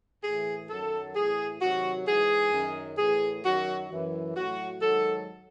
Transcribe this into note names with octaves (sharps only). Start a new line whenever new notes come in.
A2 E3 G#4
F#2 D#3 F#3 A4
A2 E3 G#4
C3 D#3 F#3 F#4
G#2 E3 G#4
F#2 D#3 F#3
A2 E3 G#4
F#2 D#3 F#3 F#4
F#2 E3
A2 F#3 F#4
G#2 D#3 F#3 A4